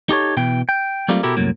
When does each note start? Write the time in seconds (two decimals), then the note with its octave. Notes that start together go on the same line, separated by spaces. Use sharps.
0.09 D#4 G4 A4 C#5
0.37 B2 E3 G5
0.69 G5
1.08 F#3 G3 A3 A#3 C4 F4
1.23 B2 E4 F#4 G4 A4 A#4
1.37 C2 F#2 A2 F#3 A#3